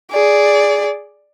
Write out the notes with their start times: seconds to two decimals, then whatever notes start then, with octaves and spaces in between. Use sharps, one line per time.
0.11 G#4 D5